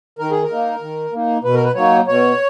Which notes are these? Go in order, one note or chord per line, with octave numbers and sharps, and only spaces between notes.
D#3 A#4
G#4
A#4
A#3 D#4
D#3
A#3 D#4
B2 B4
A#4
B4
F#3 A#3 D#4 C#5
B2 C#5